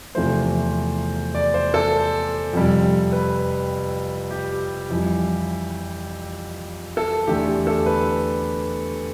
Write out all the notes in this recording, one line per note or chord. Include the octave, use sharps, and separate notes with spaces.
E2 C3 F3 A3 C5
D5
C5
A4
F2 C3 G3
B4
G4
F2 E3 G3
A4
E2 D3 A3 G4
G4
A4
B4